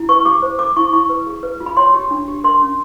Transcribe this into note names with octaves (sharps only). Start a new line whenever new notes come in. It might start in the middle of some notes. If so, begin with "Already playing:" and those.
Already playing: E4
B4 C#6
G4 D6
C5
A4 D6
E4 C#6
E4 C#6
B4
G#4
B4
F4
B5
C#5 C6
G4
D4
G4
A#4 C6
C#4